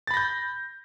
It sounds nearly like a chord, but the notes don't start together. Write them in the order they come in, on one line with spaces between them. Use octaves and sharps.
A6 B5 A#6 G6